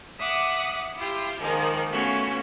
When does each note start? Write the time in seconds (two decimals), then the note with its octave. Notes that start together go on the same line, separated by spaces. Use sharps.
0.19 E5 F#5 D6 D#6 F#6
0.95 E4 F4 G4
1.39 D#3 F3 G#3 A#3
1.90 A3 B3 C#4 F4 F#4